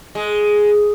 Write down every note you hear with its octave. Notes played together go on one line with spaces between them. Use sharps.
G#3